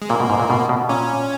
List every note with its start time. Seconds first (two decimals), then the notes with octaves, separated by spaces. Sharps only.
0.02 G#3
0.09 A#2 A#3
0.20 B2
0.30 G#2
0.40 A#2
0.50 B2
0.69 B2
0.89 A#2 C#4